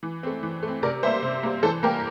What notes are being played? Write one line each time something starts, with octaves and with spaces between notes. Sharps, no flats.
E3
A3 C4
E3
A3 C4
C3 A#4 D5
G3 A#3 C5 E5
C3
G3 A#3
E3 A4 C5
G3 A#3 G4 A#4